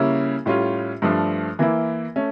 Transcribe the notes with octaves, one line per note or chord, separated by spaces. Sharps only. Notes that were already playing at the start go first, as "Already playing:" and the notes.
Already playing: C#3 G3 A#3 C#4 E4
A2 G3 C#4 F4
G2 F3 A3 D4
E3 A#3 E4
A3 C#4